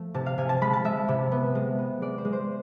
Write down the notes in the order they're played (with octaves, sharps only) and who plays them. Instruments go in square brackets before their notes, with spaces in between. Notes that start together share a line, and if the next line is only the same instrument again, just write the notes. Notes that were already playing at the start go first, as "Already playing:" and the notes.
Already playing: [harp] F3 A3
C3 A5
F5
C3 G#5
A5
G#3 B5
A5
G#3 E5
C3
B3
G#3
B3
G#3 D5
C5
G#3
C5